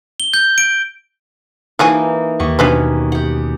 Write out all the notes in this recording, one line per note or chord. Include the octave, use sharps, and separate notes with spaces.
G7
G6
D7
E3 F3 A#3 D#4 F#4 G#4
D#2 F#5 C#6
B2 B3 C#4 D4 B4 C5
G4 F#5